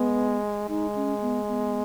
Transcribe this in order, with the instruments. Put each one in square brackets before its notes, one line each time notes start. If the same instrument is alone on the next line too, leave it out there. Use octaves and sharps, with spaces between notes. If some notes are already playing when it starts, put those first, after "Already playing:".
Already playing: [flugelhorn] G#3 [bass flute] B3
[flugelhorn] G#3 [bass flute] D#4
[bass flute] C#4
B3
B3